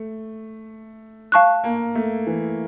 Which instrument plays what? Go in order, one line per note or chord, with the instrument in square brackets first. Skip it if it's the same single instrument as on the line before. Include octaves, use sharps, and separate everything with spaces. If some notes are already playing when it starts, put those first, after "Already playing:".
Already playing: [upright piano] A3
[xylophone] F5 A5 C#6 F#6
[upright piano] A#3
A3
E3